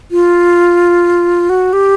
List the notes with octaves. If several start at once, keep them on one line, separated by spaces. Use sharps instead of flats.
F4
F#4
G4